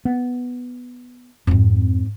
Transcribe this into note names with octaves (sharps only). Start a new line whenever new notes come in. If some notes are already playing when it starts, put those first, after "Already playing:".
B3
F2 G#2 C4